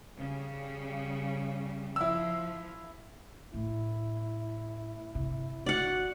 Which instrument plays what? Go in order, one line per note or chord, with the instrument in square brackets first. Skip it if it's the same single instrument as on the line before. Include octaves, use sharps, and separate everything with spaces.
[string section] C#3 G3
[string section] F3 [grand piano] E4 E6
[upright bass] A2 [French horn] E4
[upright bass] G1 C3
[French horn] F#4 [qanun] D5 F#5